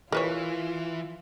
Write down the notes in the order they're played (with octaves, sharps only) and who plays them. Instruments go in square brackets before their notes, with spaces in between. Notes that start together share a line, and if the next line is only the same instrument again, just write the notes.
[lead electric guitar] E3 [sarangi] F4 [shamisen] A#4 B4 C#5